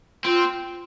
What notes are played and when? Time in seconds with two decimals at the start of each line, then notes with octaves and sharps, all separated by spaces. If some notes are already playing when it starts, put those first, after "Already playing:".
0.25 C4 F4